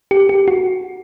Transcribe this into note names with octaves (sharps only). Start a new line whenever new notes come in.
G4
G4
F#4